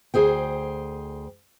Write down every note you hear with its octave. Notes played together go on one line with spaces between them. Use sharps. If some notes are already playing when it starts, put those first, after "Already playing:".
D2 G#4 C5 G5